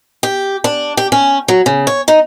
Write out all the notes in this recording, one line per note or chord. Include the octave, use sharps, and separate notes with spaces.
G4
D4
G4
C#4
F#3
C#3
C#5
D#4